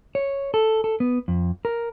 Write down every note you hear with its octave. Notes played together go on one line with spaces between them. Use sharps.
C#5
A4
A4
B3
F2
A#4